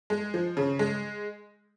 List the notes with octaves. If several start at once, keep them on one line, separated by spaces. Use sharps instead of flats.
G#3
F3
C#3
G#3